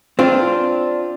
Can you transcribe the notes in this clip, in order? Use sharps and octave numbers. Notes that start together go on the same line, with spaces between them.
C4 D4 F4